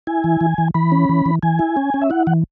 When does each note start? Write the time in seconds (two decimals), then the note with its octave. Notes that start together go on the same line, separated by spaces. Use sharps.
0.07 E4 G#5
0.24 E3
0.41 E3
0.58 E3
0.74 E3 B5
0.92 C#4
1.09 E3
1.26 E3
1.43 E3 G#5
1.59 E4
1.77 C#4
1.94 C#4
2.02 E5
2.10 E4 F#5
2.27 E3 F#5